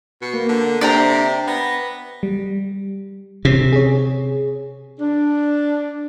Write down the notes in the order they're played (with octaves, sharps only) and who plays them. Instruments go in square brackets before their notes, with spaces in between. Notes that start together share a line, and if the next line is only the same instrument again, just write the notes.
[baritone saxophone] B2 [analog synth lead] C#7
[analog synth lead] A#3
[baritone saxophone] D3
[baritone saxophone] C3 [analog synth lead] D4 [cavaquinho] D5 G5 A#5
[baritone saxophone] B3 [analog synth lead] A#6
[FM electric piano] G3
[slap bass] C3 [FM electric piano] C#4
[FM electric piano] G#4 C#5
[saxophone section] D4